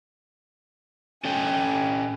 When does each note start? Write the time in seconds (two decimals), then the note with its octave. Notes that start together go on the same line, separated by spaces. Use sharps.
1.25 C#4 A4 G5 G#5